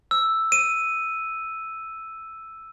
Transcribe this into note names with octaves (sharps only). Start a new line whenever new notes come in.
E6
D#7